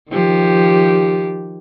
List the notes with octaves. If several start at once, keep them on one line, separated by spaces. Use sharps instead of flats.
D#3 F3 G4